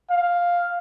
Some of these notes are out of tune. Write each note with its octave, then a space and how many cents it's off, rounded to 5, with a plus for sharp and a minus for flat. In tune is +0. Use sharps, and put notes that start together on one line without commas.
F5 +5